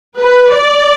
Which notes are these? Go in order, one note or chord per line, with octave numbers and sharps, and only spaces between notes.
B4
D5